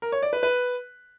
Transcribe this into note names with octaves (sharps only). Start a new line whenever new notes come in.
A#4
C#5
D5
B4
B4